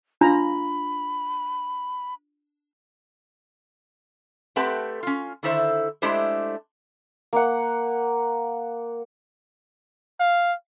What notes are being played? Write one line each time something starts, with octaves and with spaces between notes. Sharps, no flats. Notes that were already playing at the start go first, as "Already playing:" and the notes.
D4 F4 A#5 B5
A3 C4 G4 B4 F#5 A5
C#4 F4
D3 D#3 E4 A4 C5 E5
G#3 A3 D4 E4 G4 C5
A#3 F#5
F5